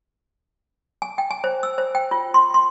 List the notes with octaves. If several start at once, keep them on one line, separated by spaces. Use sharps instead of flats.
G#5
G5
G#5
C5
E6
C5
G5
F4
C6
C6